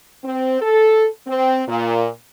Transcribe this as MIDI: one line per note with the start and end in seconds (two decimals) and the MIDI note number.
0.24 0.60 60
0.61 1.06 69
1.27 1.62 60
1.68 2.08 46